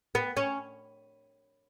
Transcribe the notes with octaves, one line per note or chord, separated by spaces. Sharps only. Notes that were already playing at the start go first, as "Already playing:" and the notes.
B3
C#4